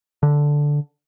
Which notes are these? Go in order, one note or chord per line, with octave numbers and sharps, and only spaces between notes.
D3